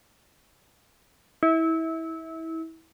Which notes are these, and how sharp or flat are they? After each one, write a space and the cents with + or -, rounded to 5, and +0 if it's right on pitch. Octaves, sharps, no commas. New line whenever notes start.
E4 -25